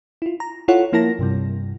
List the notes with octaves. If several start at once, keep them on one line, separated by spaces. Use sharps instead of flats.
E4 F4
A#5
E4 F4 A4 C#5 F#5 C#6
F3 A#3 E4 A#4 A5 A#6
G2 C3 G3